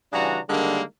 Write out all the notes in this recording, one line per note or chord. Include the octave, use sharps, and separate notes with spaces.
C#3 E3 G3 D4 F#4 A#5
D3 D#3 G3 G#3 A#3